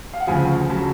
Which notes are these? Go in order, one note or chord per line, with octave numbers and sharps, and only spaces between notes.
F5
F#5
D2 C#3 F3 G#5
C#3 F#3 A5